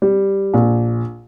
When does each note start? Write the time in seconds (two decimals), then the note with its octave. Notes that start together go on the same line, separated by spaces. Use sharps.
0.02 G3
0.54 A#1